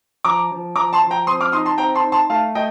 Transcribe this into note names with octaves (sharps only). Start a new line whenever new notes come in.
F3 A#5 D6
F3
F3 A#5 D6
A5 C6
F3
G5 A#5
C4 C6 D#6
D6 F6
D#4 C6 D#6
A5 C6
C4 G5 A#5
A5 C6
D#4
A5 C6
A3 F5 A5
A3 D#5 G5